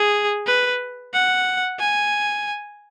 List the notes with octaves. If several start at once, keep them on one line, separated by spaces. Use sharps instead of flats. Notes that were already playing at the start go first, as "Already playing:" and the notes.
Already playing: G#4
B4
F#5
G#5